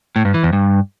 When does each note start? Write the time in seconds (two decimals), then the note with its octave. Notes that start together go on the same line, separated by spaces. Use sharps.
0.16 A2
0.25 G2
0.34 E3
0.43 E2
0.53 G2